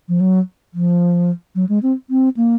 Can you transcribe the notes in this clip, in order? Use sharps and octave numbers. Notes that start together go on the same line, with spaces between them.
F3
F#3
F3
F#3
G#3
C4
C4
A#3